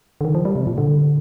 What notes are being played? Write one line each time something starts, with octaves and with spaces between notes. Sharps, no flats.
D3
D#3
F3
G3
C3
A#2
D3